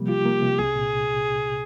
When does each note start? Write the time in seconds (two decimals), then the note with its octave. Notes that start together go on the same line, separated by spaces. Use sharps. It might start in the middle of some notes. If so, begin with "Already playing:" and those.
Already playing: C3 F3 G3 A#3
0.09 F4 G4
0.25 A#3
0.42 C3
0.59 C2 G#4
0.76 A#2